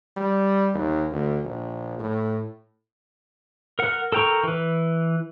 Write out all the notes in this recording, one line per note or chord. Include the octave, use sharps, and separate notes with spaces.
G3
D#2
D2
A#1
A2
A#4 F#5
A4 A#4 G5 A#5 C#6
E3 B4